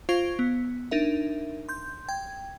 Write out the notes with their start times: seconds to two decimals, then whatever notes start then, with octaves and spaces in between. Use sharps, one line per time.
0.09 F4 C5 F5 C#6 G#6 D7
0.39 B3
0.91 D4 D#4 A#4 E5
1.69 C6 G6
2.09 G5 G#6